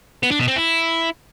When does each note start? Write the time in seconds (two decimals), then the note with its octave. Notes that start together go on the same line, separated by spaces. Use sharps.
0.23 B3
0.31 D4
0.39 B2
0.48 C4
0.56 E4